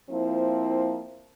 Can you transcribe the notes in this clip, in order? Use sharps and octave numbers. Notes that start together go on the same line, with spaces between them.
F3 A#3 C4 E4